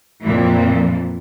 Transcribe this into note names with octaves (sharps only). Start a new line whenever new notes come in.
F2 A#2 E3